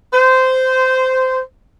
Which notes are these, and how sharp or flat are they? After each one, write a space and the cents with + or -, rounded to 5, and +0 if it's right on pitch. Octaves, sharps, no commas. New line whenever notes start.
C5 -15